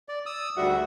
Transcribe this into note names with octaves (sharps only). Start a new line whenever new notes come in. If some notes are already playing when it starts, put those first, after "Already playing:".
D5
D#6 E6
D2 G#2 D3 G3 F#4 E5